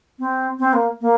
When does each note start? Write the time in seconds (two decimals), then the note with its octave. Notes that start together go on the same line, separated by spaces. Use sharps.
0.19 C4
0.59 C4
0.73 A#3
1.01 A#3